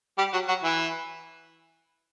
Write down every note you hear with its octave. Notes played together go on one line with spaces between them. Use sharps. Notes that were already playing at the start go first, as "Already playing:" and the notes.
G3 G4
F#3 F#4
F#3 F#4
E3 E4